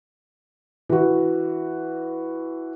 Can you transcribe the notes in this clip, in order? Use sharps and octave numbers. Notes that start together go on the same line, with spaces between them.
E3 F#4